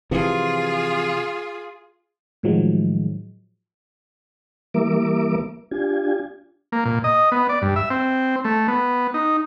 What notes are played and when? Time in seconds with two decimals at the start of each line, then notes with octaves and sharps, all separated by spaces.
0.11 C3 E3 F3 F4 G#4
2.43 A2 D#3 F3 F#3 G#3
4.74 E3 G3 A#3 A#4 E5 D6
5.71 D4 F4 G4 G#5
6.72 A#3
6.85 A#2
7.04 D#5
7.32 B3
7.49 D5
7.62 G2
7.76 E5
7.90 C4
8.45 A3
8.68 B3
9.14 D#4